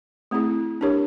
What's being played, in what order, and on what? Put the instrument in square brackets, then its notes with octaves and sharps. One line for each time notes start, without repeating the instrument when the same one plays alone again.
[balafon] A3 C4 E4 G#4
D4 G4 A#4 C#5